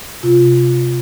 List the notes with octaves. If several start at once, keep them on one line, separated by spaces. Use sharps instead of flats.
C3 F4
C3